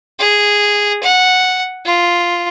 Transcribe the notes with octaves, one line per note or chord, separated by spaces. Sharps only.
G#4
F#5
F4